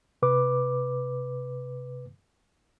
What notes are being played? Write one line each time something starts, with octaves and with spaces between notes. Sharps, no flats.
C3 B4 D6